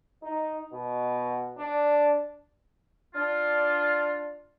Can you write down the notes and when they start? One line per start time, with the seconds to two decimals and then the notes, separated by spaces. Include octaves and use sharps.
0.23 D#4
0.73 B2
1.58 D4
3.14 D4 F4